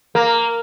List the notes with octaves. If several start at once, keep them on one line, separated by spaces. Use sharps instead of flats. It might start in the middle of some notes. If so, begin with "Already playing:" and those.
A#3